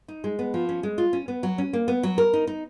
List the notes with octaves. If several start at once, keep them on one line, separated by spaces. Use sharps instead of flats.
D#4
G#3
B3
F3
C#4
G#3
F4
C#4
B3
F#3
C#4
A#3
B3
F#3
A#4
D#4
D#4